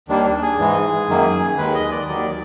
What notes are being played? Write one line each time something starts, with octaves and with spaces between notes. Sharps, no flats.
D#2 D#3 G3 A#3 D4
D4
G#4
G#2 E3 G#3
F#2 D#3 F#3 A#3
D#2 D#3 G#3 B4
D#5
D5
D#2 D#3 F#3 D5